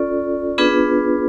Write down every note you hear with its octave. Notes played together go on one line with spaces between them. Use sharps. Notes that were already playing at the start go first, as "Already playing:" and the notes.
Already playing: C#4 F4 A4 D5
B3 D4 F4 G#4 B4